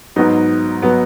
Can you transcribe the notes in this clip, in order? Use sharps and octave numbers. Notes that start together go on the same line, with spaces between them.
G#2 F#3 B3 D#4
F#3 B3